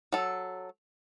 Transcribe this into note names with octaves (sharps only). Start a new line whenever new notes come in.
F#3 A4